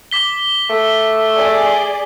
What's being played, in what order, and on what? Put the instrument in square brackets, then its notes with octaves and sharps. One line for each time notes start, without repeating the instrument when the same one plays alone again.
[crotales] D6 B6 G7
[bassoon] A3
[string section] G#4 D5